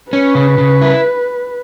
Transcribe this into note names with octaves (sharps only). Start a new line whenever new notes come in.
C#4 B4
C#3
C#3
E4